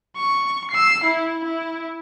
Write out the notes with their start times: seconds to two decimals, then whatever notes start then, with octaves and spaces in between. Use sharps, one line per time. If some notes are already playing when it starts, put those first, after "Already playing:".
0.16 C#6
0.71 E6 C7
1.04 E4
1.45 E4